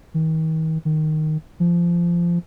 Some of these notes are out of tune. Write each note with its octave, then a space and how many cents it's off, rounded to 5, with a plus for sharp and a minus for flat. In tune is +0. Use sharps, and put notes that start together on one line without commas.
D#3 +40
D#3 -5
F3 -20